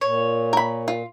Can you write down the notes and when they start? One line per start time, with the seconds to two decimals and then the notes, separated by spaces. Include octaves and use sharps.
0.01 A#2 C#5
0.53 A#4 B5
0.88 F4